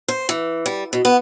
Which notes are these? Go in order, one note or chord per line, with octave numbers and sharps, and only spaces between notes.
C5
E3
G3
B2
B3